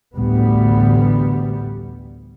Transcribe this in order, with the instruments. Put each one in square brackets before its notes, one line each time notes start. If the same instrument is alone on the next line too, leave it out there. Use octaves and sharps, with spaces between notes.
[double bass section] A1 D2 G3 B3